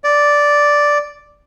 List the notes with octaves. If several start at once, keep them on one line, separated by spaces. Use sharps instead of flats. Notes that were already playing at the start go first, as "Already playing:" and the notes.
D5